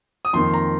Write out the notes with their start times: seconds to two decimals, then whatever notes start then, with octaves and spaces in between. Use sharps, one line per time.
0.25 D#6
0.33 F2 D#3 A#3 C6
0.54 A#5